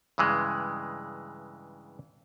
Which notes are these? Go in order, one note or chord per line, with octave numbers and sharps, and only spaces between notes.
G2 C#3 E3 G#3